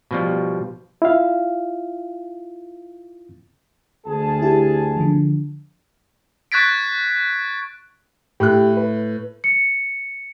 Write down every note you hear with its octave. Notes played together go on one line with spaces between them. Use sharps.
B2 F3 G3
E4 F4 F5
D2 G#4 A5
E4 G4
D3 F3
C#6 F#6 G#6 A6 B6 D7
A2 G4 F#6
B4
C#7